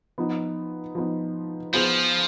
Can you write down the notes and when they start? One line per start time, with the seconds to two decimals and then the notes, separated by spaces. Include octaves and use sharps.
0.18 F3 B3 D#4
0.95 F3 B3 D#4
1.73 F3 B3 F4 G#4 C5